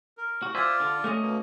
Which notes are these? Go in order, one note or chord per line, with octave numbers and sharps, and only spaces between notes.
A#4
F#4
F4 C5 D5 E5 G#5
D3
A3 C#4 D#5
B2 A#3